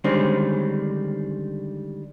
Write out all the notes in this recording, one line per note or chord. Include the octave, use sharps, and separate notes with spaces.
D3 D#3 G3 G#3 C4 C#4